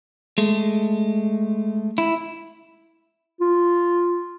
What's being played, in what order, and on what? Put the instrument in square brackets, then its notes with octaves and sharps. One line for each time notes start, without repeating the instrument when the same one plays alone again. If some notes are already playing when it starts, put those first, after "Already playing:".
[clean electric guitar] G#3 A3
E4
[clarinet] F4